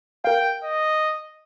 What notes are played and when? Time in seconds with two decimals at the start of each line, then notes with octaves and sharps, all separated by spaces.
0.24 A#4 F5 G5
0.63 D#5